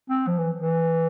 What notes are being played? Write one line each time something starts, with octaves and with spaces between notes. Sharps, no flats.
C4
F3
E3
E3